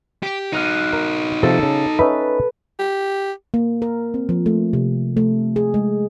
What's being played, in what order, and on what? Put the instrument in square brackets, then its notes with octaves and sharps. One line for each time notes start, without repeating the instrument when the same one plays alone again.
[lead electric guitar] G4
[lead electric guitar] D#4 F#4 [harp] F6 F#6 D#7
[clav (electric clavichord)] A#4
[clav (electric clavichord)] C3 F3 [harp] A4
[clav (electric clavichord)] C#3
[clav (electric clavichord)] C#4 D#4 E5 [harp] B4
[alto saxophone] G4
[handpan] A#3
A#4
C4
F3
A3
C3
A3
G#4
G#3